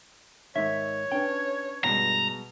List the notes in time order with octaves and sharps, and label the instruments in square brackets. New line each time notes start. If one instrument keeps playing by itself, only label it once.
[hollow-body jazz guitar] G#2 E5 [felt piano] D#3 [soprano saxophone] C#5
[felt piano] C#4 D4 B4 [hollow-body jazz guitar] G5
[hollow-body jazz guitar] C2 G2 [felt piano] B2 G#3 [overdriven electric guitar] A#5